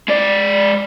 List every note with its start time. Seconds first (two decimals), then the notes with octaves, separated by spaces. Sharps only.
0.08 G#3 D5